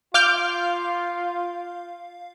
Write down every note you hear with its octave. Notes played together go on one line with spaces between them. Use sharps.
F4 F5 D6 F6 G6